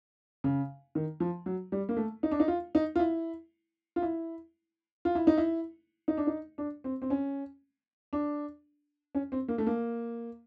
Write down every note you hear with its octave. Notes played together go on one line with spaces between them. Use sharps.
C#3
D#3
F3
F#3
G3
A#3
A3
D#4
D4
D#4
F4
D#4
F4
E4
F4
E4
F4
E4
D#4
E4
D#4
D4
D#4
D4
C4
C4
C#4
D4
C#4
C4
A#3
A3
A#3